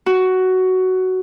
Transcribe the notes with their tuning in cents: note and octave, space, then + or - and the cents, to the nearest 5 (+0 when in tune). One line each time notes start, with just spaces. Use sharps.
F#4 +10